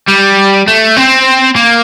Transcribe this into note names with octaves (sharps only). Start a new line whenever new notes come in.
G3
A3
C4
A#3